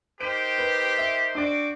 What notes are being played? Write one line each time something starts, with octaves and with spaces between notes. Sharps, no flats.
D#4 G4 A#4 C5 D7
B4
E5
C4 D4 F#4 D5 D6